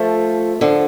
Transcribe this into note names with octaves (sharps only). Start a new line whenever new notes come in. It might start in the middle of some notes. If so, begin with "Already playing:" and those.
Already playing: F3 A3
D3 F3